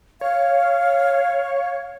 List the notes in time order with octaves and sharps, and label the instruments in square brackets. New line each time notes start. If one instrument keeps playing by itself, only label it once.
[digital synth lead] C#5 [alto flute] F5